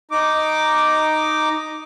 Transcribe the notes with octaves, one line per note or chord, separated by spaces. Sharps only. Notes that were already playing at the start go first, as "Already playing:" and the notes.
D#4 D6